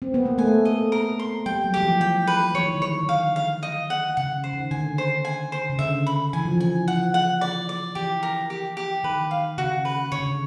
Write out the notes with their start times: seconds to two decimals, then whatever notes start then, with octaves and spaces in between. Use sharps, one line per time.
0.02 C4
0.14 B3
0.26 A#3
0.38 A3 G#5
0.65 D#5
0.92 A#4
1.19 C6
1.46 G3 G5
1.64 F#3
1.74 E3 G4
1.83 F3
2.01 E3 G5
2.27 B4
2.54 E3 C#5
2.63 D#3
2.73 D3
2.81 D#3 C#5
3.03 D#3
3.09 D3 F5
3.36 F5
3.63 D#5
3.90 F#5
4.17 C#3 F#5
4.44 C5
4.53 D#3
4.71 D3 G#5
4.98 C5
5.25 G#5
5.52 C5
5.70 C#3
5.79 D3 E5
6.06 B5
6.33 E3 G#5
6.45 F3
6.57 E3 G#5
6.88 F3 F#5
7.14 F#5
7.41 D5
7.69 D5
7.95 E3 G4
8.23 A#4
8.50 G4
8.77 G4
9.04 D#3 B4
9.31 F5
9.58 C#3 F#4
9.85 B4
10.12 D3 C#5
10.20 C#3